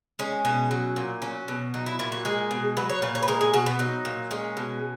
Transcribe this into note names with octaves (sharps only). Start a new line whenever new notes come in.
G#3 C#4
B2 C#4
F#3
A#2
F#3 C#4
B2
F#3 D#4
E4
A#2 E4
F#4
G#3 G#4
B2
F#3 B4
C#5
A#2 B4
C#5
B4
G#3 A#4
G#4
B2 F#4
B3
F#3 D#4
A#2
G#3 C#4
B2